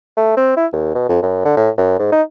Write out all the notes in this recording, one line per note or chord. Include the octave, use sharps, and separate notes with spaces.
A3
C4
E4
D#2
B2
F2
F#2
D3
A2
F#2
G#2
D#4